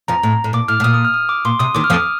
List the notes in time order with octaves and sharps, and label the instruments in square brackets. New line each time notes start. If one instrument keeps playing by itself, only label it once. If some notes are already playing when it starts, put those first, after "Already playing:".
[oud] F2 F3 [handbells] A#5
[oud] A2
A2
[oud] A#2 [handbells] D6
[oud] A2 [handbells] F6
[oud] A2
[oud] A#2 [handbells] D#6
[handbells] D#6
F6
D#6
D6
[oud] A#2 [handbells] C6
[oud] C3 [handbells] D#6
[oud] D#2 D#3 [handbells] D6
[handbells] F6
[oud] F2 F3 [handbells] D#6